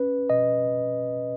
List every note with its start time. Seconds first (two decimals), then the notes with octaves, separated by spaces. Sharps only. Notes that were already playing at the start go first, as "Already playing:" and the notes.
Already playing: C#4 B4
0.30 B2 D#5